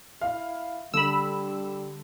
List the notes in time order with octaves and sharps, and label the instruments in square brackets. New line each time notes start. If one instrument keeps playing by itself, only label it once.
[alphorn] E4 [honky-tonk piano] F5
[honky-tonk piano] D3 [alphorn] G3 [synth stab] B5 E6